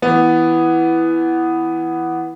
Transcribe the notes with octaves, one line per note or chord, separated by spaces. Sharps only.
E3 B3